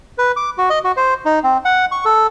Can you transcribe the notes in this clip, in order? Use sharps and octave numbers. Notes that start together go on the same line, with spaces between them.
B4
D6
F#4
D#5
F#4
C5
D#4
C4
F#5
C#6
A4